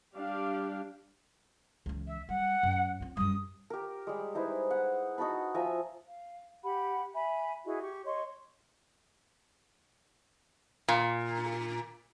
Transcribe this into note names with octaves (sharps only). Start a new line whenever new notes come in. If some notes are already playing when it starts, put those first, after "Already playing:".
G3 D4 G4 F5
C#2 E3
E5
G3 F#5
F#2
C4 F4
F#2 G3 D#6
G4 A#4
G3 G#3
D#4 E4 B4 C5
F#5
D#4 F#4 A5 B5
F3 E5 G#5 A#5
F5
G4 F#5 B5
E5 G#5 B5
E4 F#4 G#4 D#5
G4 C#6
C#5 D#5 C6 C#6
A#2